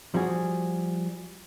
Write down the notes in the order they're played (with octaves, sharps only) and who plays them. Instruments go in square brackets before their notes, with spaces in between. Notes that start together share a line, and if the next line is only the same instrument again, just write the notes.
[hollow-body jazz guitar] F3 G3 F#4 G#4